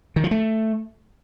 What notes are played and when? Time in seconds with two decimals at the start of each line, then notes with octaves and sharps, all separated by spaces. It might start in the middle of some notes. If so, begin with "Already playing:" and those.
0.16 D#3
0.24 F3
0.31 A3